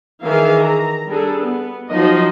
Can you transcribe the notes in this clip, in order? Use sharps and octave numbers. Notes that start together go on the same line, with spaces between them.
D#3 E3 G#4 E5 F5
A#5
G3 D4 G#4 A4
B3
F3 F#3 D#4 F4 C5 D#5